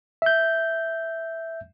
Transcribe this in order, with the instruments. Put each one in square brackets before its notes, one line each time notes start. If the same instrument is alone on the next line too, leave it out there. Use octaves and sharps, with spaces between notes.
[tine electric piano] E5 G6